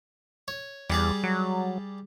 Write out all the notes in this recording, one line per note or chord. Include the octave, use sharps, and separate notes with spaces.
C#5
E2 G3 G#4 D5
F#3